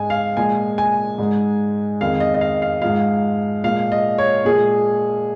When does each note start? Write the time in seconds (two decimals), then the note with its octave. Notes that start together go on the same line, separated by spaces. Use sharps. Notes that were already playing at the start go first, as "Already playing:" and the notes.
Already playing: G#2 G#3 G#5
0.10 F5
0.37 A#2 F3 G#3 G#5
0.78 G#5
1.18 G#2 G#3
2.01 F2 D#3 G#3 F5
2.20 D#5
2.34 D#5
2.41 F5
2.62 F5
2.82 G#2 F3 G#3 F5
3.64 A#2 F3 G#3 F5
3.92 D#5
4.18 C#5
4.45 A#2 F3 G#3 G#4